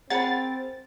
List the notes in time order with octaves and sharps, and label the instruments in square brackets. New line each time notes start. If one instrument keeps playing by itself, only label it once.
[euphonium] C4 [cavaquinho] G#4 A#4 [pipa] F#5 B5 [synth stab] A6